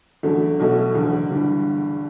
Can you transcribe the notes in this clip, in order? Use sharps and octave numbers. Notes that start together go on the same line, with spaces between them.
E2 D3 F#3 A3 C#4
B1 B2 A3
F#1 E2 D3
G1 G2 E3